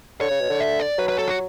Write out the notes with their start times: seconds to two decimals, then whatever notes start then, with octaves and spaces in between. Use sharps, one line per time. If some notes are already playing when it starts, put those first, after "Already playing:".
0.21 D3 C#5
0.30 C#3
0.40 B2
0.49 D3
0.60 E5
0.80 D5
0.98 F#3 B4
1.09 B4
1.18 A4
1.28 F#4